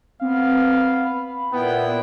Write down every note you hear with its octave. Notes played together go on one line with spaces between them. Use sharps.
B3 C4 F5
B5
A#2 B3 E4 G5